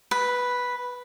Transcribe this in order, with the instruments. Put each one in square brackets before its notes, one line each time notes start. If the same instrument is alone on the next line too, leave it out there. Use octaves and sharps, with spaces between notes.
[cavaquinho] B4